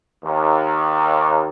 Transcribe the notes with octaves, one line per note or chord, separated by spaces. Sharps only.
D#2